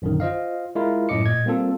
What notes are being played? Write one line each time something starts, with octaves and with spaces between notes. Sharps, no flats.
A#1 F#2 D3 D#3
F4 C5 D#5 F5
G#3 E4 F4 A#4
F#2 A2 A3 D#5 D6 C#7
A#2 D#5 G#6
G3 A#3 C4 F4 A4